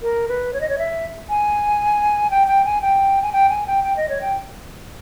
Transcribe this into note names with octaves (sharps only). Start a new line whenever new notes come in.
A#4
B4
C#5
D#5
C#5
E5
G#5
G5
G5
G#5
G5
G#5
G5
G#5
G5
G5
D#5
C#5
G5